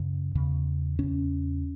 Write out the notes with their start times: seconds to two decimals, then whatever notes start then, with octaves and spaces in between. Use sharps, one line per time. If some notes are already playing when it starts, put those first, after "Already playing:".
Already playing: F#2 C#3
0.35 E2 C#3
0.99 E2 C#3 C#4